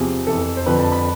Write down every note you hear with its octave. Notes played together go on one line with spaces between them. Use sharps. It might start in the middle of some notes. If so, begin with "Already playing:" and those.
Already playing: E2 C3 F3 G#4
F2 E3 A4
C5
F2 D3 F3 B4
A5
B5